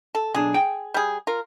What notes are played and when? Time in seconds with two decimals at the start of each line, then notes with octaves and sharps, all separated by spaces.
0.15 A4
0.35 B1 D4 G#4
0.54 G5
0.94 G3 G#4
1.27 F4 A#4